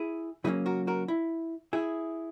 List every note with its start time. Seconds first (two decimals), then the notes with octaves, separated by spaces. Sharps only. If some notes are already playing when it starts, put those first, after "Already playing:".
Already playing: E4 G#4
0.44 C#3 F#3 A#3 C#4 E4 G#4
0.66 F#4 A#4
0.87 F#4 A#4
1.08 E4
1.73 E4 G#4